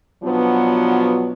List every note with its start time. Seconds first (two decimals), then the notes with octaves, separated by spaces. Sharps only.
0.23 B2 F3 F#3 B3 D4